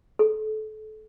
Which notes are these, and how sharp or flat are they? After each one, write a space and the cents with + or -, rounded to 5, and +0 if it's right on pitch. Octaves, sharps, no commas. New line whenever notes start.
A4 -30